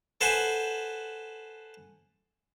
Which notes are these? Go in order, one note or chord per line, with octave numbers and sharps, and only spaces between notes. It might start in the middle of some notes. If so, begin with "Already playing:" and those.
A4 B4 C5 F#5 G#5